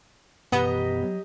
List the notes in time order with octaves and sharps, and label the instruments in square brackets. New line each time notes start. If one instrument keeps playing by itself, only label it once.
[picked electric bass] F#2 B2 E3 [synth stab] B3 [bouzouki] G4 D#5 A#5
[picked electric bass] F#3